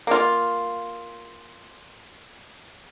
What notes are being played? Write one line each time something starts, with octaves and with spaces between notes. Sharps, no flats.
A#3 F4